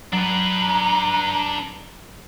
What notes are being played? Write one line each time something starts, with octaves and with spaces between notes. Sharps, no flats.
F#3 D4 B4 A#5